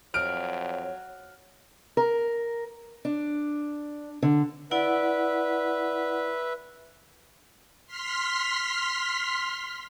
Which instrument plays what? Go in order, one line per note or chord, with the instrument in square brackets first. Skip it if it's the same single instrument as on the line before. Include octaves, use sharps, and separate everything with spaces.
[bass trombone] F2 [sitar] F#3 [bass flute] C#5 [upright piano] F6 D7
[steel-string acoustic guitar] A#4
D4
D3
[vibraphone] E4 D5 F#5 [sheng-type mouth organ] B4 E5
[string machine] C6 F6 B6